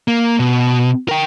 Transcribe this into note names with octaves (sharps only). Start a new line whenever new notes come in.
A#3
B2
A#4 G5